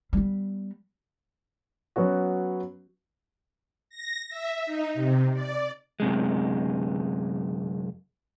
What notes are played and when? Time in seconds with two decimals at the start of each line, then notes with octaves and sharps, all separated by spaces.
0.13 G3 B3
1.96 F#3 B3 C#4 F#4
3.89 A#6
4.29 E5
4.65 D#4
4.94 C3
5.33 D5
6.00 F#2 C3 G#3